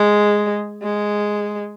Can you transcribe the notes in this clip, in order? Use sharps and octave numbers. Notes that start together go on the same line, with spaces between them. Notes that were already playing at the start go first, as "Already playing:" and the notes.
Already playing: G#3
G#3